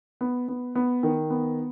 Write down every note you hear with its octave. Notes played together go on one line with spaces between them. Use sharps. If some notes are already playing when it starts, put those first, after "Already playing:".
B3
B3
B3
D#3
B3